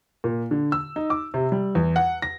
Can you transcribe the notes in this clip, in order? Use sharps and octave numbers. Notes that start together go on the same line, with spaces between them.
A#2
D3
E6
D#4
D6
C3
G3
E2
F#5
A#6